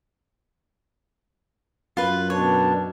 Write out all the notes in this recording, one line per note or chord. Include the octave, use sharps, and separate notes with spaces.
F#2 F4 B4
B2 D4 C#5